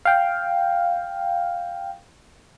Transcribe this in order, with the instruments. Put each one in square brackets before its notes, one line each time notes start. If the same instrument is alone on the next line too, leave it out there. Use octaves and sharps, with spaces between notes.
[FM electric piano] F5 G5